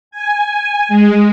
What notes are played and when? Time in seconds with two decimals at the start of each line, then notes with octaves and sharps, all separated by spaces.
0.11 G#5
0.89 G#3